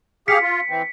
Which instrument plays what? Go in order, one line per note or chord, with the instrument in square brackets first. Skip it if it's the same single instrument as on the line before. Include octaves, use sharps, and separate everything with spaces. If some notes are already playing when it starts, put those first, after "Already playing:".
[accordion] G4 G#4 F5 [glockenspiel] B6 C#7
[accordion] F4
E3 C4